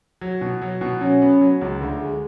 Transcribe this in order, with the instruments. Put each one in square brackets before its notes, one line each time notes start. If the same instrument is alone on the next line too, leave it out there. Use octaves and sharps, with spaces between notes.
[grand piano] F#3
B2
F#3
B2
[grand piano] F#3 [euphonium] C#4
[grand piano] B3
F#3
C#2
D2
G#3